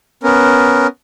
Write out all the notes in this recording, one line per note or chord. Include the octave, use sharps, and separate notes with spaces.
B3 C#4 A#4